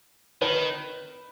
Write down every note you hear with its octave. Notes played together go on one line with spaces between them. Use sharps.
D#3 B4